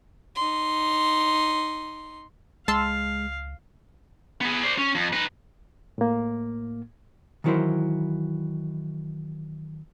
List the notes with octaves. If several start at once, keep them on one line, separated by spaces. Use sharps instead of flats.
D#4 C6
C#2 G#3 F5 A5 C6 E6
B3 G#4
C5 D5
C#4
F2
D#4 B4
A2 A#3
D#3 E3 F#3 E4 A#4 C5